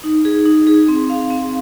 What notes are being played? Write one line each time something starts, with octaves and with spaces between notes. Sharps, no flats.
D#4
G#4
D#4
G#4
C4
F5
C4